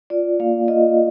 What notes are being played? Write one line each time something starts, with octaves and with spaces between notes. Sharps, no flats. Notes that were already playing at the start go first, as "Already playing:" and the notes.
F4 D5
A#3 F5
F4 D#5